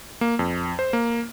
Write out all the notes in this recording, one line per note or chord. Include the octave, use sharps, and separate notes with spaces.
A#3
F2
C5
A#3